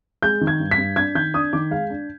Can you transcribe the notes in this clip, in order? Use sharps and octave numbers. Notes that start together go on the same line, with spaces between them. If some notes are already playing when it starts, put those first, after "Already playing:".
G#3 G6
D#3
G#6
G2
B6
G2
D4 G#6
D#3 G6
D4 D#6
D#3 D6
G#3 F5
D4